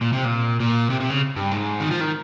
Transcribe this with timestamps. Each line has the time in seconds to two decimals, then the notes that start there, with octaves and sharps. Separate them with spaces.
0.01 A#2
0.13 C3
0.25 A#2
0.60 A#2
0.90 C3
1.01 C3
1.10 C#3
1.36 G2
1.52 G#2
1.80 D#3
1.91 F3
2.01 D#3